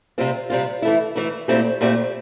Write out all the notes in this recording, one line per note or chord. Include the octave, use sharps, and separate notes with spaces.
C3 G3 C4 F4
C3 G3 C4 F4
E3 A3 E4
E3 A3 E4
A#2 A3 C4 E4 G4
A#2 A3 C4 E4 G4